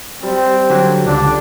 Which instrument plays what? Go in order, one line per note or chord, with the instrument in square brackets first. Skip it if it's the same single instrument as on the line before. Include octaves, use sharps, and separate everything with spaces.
[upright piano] G3 [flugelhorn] C4
[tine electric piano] D3 F#3
[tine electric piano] C#2 D3 [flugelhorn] D4